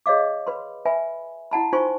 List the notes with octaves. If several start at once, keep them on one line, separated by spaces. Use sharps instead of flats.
G#4 C#5 D#5 F5 D6
B4 B5 C6
B4 E5 G#5 B5
E4 F#5 A5 B5
D#4 F4 C5 G#5 C6 C#6